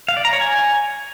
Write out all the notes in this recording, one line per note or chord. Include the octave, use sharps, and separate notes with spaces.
F5
D5
A#5
C#5
G#5